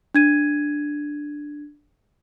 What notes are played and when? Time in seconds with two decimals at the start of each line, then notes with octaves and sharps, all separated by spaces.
0.15 D4 G#6 D#7